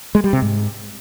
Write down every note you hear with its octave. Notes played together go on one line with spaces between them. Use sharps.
G#3
G3
C3
G#2